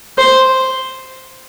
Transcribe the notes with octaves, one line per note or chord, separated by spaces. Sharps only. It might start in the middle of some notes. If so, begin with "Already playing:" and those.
C5